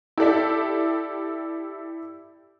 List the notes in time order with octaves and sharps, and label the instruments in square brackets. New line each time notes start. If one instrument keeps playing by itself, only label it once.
[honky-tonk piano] E4 G4 A4 D5 E5